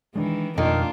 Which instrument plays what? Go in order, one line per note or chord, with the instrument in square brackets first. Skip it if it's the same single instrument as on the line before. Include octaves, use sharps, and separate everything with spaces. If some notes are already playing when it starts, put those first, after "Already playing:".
[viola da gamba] D#3 E3 [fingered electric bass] G#3 D4
[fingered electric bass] F2 B2 [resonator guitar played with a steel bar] D#3 [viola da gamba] A3 D4 F4 [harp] A#3